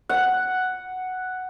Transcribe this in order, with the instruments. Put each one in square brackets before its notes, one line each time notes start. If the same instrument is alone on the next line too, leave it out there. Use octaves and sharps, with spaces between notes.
[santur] F#5